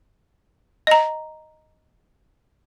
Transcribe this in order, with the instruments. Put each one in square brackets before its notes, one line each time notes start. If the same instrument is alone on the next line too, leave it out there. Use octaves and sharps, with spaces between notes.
[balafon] D#5 A#5